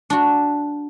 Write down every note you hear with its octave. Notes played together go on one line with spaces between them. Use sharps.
D4 F#4